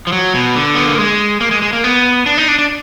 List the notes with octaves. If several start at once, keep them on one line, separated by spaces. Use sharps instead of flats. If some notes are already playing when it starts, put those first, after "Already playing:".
F3
F#3
B2
D3
B3
A#3
G#3
A#3
G#3
G#3
A#3
B3
D4
D#4
D4
D4